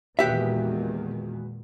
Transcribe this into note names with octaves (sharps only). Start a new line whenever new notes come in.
E2 A#2 D#3 G#3 F#4 G4 B4 E5